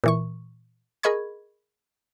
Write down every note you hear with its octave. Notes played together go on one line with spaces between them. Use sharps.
A#2 E3 C#6
G#4 A#4 D#5 B5 C#6 G#6